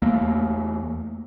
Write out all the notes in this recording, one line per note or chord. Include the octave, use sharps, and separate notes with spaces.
E2 A3 A#3